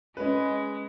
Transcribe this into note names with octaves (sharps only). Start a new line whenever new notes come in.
G#3 C#4 G#4 B4